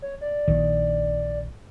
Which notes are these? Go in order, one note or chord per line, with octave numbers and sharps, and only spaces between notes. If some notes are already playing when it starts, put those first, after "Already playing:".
C#5
D5
A#1 D#3